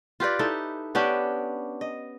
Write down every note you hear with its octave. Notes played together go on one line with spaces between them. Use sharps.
F4 G4 B4 D5
D#4 E4 A4
B3 C#4 D4 G4
D#5